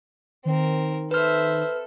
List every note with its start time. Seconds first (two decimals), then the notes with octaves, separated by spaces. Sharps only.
0.45 D#3 C4 A#4
1.11 A4 B4 C5 E5 F6